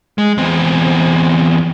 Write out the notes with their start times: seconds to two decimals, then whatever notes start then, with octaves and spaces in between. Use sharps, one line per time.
0.18 G#3
0.38 E2 C4